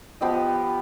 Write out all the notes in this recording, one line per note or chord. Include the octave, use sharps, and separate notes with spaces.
F3 B3 G4 D#5